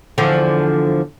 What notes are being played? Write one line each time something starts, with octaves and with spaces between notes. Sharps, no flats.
E2 D3 F3